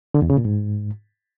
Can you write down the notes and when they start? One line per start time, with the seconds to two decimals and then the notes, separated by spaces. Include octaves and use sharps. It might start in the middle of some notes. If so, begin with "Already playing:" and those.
0.14 D3
0.22 E2
0.30 C#3
0.37 A#2
0.45 G#2